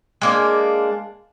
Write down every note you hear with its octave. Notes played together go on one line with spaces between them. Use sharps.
G#3 A#3 D4